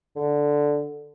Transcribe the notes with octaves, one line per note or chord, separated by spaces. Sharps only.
D3